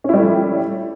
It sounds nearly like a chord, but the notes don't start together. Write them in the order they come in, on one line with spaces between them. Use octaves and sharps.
C#4 E4 G3 A3 F3